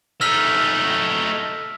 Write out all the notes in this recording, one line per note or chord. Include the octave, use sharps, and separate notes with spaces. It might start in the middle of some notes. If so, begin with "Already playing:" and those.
A3 D#4 E6 F6 B6